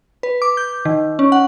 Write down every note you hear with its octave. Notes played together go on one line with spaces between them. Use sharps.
B4
D6
G6
D#3
C#4
F#5